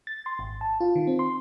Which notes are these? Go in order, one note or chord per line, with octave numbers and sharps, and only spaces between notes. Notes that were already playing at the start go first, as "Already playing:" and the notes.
A6
C6
G#1
A5
F4
D#3
C4
C6